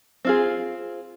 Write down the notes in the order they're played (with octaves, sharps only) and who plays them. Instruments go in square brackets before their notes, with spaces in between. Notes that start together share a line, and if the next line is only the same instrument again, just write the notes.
[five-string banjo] C4 F4 G#4